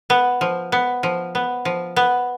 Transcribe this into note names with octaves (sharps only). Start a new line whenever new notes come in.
B3
F3
B3
F3
B3
F3
B3